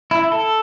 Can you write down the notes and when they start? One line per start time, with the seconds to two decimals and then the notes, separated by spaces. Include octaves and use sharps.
0.11 E4
0.32 A4